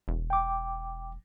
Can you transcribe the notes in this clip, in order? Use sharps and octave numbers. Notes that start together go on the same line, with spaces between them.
E1
G5 D6